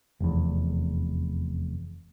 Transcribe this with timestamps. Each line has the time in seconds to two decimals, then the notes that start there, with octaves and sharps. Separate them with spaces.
0.20 F1 E2